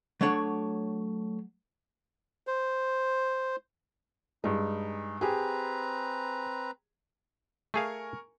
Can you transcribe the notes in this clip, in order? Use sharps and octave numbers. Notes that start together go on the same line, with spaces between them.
F#3 A3 D4 C#5 F#5
C5
G2 G#3 D#4
C4 G4 G#4 B4 A#5
A3 G#4 A#4 F5 G#5 C#6